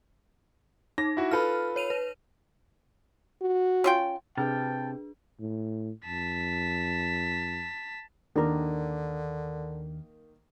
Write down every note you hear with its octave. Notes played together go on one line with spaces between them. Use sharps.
D#4 A#6
E4 F#4
F4 A4 B4 F6
C#5 D#7 F7
B4
F#4
C#4 F4 G5
C3 D4 G#4 B4 G5 A5 F6
A2
F2 A5 B6
D#2 D3 D#3 A#3 D4 A#4